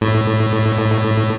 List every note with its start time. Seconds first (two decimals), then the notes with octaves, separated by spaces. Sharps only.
0.01 A2